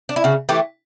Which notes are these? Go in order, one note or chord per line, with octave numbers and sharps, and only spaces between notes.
D4
E4
C#3 F#4
E3 A3 G4